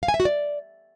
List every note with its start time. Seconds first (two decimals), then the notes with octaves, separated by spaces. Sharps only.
0.03 F5
0.08 G#5
0.14 E5
0.20 F#4
0.25 D5